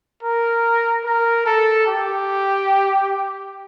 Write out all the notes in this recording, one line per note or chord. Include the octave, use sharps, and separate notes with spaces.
A#4
A#4
A4
G4